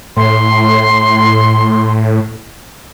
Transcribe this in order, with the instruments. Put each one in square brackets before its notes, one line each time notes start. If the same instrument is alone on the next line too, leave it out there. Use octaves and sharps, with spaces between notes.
[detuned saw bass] A2 [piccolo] C6